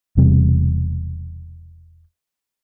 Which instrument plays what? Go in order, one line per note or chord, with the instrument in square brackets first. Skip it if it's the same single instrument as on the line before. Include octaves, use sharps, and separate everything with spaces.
[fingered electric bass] E1 E2 C3 G3